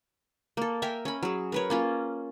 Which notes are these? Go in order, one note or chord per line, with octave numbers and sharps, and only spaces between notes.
A#3 A4
A#4 E5 G5 G#5
C#4 B5
F#3 G#4
A#4 B4 C#5
A#3 C#4 F4